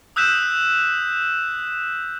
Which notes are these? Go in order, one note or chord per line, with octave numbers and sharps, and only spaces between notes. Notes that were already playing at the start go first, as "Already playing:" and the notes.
D#6 E6 F#6 G6 B6 E7